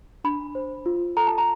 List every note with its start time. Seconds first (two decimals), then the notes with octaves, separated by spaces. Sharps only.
0.24 D4 B5
0.55 C5
0.86 F4
1.17 A4 A#5
1.27 A5
1.38 A#5